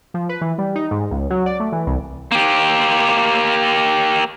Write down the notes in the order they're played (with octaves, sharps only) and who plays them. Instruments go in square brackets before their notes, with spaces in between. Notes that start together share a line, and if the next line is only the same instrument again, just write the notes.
[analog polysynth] F3
B4
E3
G3
D#4
G#2
C#2
F#3
D5
A3
E3
C2
[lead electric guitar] A#3 G4